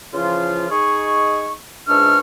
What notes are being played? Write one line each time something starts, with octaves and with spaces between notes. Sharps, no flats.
C#3 E3 F3 F4
D#4 G#4 C#6
C#2 G#2 D4 E5 C#6 F6